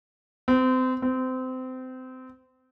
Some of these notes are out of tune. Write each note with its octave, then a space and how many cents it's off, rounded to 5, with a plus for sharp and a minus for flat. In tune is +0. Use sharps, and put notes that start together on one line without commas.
C4 -30
C4 -25